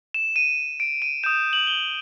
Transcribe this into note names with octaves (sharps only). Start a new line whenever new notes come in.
E7
D#7
D7
D#7
D#6 G6 E7
F#7
G7